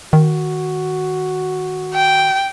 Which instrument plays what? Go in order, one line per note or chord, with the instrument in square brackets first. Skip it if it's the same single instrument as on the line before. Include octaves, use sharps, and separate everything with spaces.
[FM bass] D#3 [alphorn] F#4
[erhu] G5